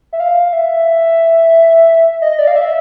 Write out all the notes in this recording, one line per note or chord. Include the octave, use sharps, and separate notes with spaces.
E5
F5
E5
D#5
D5
F5
E5